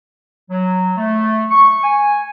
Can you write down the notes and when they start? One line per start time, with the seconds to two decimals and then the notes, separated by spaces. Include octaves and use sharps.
0.50 F#3
0.98 A3
1.51 C#6
1.83 G#5